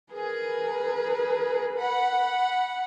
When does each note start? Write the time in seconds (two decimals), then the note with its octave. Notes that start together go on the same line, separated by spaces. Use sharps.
0.12 G#4 A#4 B4
1.77 F#5 B5